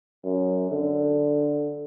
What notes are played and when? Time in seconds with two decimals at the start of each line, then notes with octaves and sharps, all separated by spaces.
0.24 F#2
0.71 D3